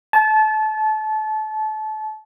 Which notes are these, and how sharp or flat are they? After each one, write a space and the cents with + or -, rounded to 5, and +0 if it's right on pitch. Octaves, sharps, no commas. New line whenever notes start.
A5 -25